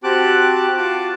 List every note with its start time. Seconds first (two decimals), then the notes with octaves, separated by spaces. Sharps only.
0.04 C4 F#4 G4 A5 D6 F#6
0.77 F4 F#4 A5 D6